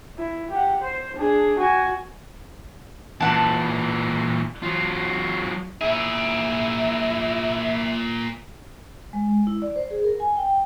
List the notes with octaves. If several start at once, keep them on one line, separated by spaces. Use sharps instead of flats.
E4
G4 F#5
C5
D4 G#4
F#4 G#5
A#2 E3 F#5 A5
F#3 F4
A#2 E4 G#4
G#3
E4
D5
C5
G#4
A#4
G#5
G5